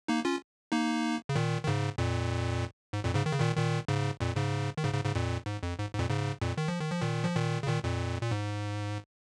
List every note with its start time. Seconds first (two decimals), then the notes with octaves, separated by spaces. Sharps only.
0.08 A#3 D#4
0.25 C#4 F4
0.72 A#3 D#4
1.29 C#3
1.35 A#2 D#3
1.64 D#3
1.67 G#2 C#3
1.98 F2 A#2
2.93 G#2
3.04 F2 A#2
3.15 G#2 C#3
3.26 D#3
3.33 C#3
3.40 A#2 D#3
3.57 A#2 D#3
3.88 G#2 C#3
4.20 F2 A#2
4.36 G#2 C#3
4.78 D#3
4.84 G#2 C#3
4.94 G#2 C#3
5.04 G#2 C#3
5.15 F2 A#2
5.46 G#2
5.63 F2
5.79 G#2
5.95 G#2
5.99 F2 A#2
6.10 G#2 C#3
6.41 F2 A#2
6.58 D#3
6.68 F3
6.80 D#3
6.90 F3
7.01 A#2 D#3
7.24 F3
7.36 A#2 D#3
7.63 C#3
7.67 A#2 D#3
7.84 F2 A#2
8.21 A#2
8.31 G#2